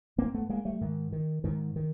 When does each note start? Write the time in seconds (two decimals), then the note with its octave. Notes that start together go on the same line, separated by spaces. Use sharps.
0.18 G#2 A#3 C4
0.34 A3 B3
0.50 G#3 A#3
0.65 G3 A3
0.81 G#2 D#3
1.12 D#3
1.44 G#2 D#3
1.76 D#3